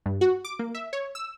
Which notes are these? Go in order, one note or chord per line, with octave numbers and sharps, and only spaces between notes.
G2
F#4
D6
A#3
E5
C#5
E6